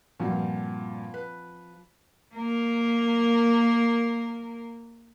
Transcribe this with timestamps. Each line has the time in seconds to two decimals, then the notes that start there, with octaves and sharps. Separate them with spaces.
0.20 G2 A#2 F3 C4 F#4
1.14 B4
2.36 A#3 A#4